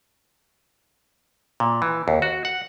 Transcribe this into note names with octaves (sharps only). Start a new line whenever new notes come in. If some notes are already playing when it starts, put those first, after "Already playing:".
A#2
E3
D#2
F#4
F#5